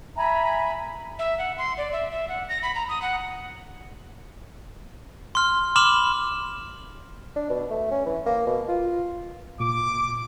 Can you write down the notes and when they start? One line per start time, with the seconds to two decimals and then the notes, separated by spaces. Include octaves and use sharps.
0.16 E5 G#5 A#5 B5
1.19 E5
1.38 F#5
1.58 C6
1.78 D5
1.92 E5
2.11 E5
2.29 F#5
2.49 A#6
2.63 B5
2.75 A#5
2.89 D#6
3.02 F#5
5.35 C6 F6
5.76 B5 C6 D6 F6 E7 F#7
7.36 D4
7.50 B2
7.71 A3
7.91 C#4
8.06 E3
8.26 A#3
8.47 B2
8.68 F4
9.60 A#2 D6